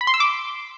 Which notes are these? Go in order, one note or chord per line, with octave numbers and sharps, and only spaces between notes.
B5
C6
E6
D6